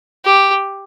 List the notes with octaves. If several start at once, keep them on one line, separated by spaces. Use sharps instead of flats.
G4